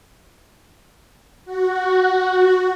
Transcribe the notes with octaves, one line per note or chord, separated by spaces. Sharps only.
F#4